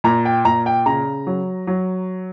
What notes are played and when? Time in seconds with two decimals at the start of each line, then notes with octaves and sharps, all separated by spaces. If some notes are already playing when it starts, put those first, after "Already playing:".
0.04 A#2 A#5
0.25 G5
0.45 A#2 A#5
0.66 G5
0.86 C#3 A#5
1.27 F#3
1.67 F#3